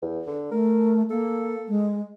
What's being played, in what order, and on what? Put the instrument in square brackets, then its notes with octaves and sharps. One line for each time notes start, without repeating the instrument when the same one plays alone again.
[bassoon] E2
D3
[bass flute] A3 [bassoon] A#4
[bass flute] A#3 [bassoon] A4
[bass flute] G#3